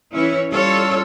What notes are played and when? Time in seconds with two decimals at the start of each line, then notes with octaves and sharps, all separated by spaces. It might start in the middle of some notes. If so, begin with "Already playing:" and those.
0.14 E3 C#4 E4 C#5
0.49 G3 C#4 F4 A4 C#5